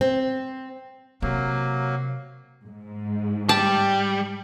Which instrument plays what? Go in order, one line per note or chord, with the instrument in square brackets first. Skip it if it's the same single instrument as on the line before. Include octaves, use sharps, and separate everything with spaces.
[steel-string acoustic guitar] C4
[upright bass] C3 [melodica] F#3 A#3
[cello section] G#2
[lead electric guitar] G3 [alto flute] G5 [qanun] A5